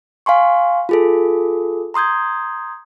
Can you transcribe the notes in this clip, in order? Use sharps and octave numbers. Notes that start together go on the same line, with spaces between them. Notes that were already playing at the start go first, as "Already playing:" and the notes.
F5 G#5 C6 C#6
F4 G#4 A4
A#5 C6 D#6 G6 G#6